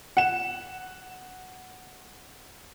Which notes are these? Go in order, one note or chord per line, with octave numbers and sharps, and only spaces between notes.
F#5 E7